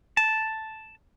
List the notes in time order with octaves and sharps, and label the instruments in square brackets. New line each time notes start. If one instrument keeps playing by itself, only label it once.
[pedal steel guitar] A5